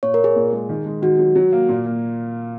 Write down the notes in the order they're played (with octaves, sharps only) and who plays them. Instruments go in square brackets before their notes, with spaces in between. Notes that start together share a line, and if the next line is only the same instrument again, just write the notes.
[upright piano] A#2 [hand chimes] C#5
[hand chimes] A#4
[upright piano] A#3 [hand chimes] G#4
[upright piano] A#2
G#3
D#3
G#3
[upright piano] D#3 [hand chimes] F#4
[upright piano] F#3
F#3
A#3
A#2
A#3